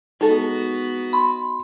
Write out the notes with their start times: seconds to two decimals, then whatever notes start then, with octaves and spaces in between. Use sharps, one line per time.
0.21 G#3 B3 D#4 F#4 A4
1.13 B5 C6